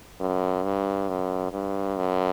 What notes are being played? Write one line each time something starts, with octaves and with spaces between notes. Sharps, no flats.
F#2
G2
F#2
G2
F#2